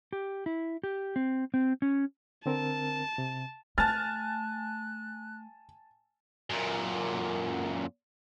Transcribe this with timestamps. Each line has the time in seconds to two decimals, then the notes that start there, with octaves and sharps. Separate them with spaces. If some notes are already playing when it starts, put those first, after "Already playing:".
0.13 G4
0.46 E4
0.84 G4
1.16 C4
1.54 C4
1.82 C#4
2.46 D3 C4 A#4 A5
3.18 C3
3.78 A3 G#5 A5 F6 F#6 A6
6.50 F#2 A#2